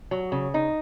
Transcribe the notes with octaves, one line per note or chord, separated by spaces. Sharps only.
F#3
C#3
D#4